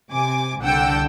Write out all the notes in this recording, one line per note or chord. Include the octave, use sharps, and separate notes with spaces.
C3 G#5 D6
C2 D3 F#5 G5 A5 E6